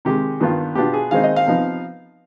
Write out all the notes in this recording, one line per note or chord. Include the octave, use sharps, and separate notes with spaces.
C3 D#3 G#3 G4
G2 D#3 B3 D4 F4
B2 B3 D4 F4 G4
G#4
D#3 G#3 C4 D#4 F5
D#5
F5
C3 F3 B3 D#4